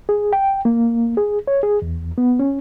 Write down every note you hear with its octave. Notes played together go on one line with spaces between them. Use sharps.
G#4
G5
A#3
G#4
C#5
G#4
E2
B3
C#4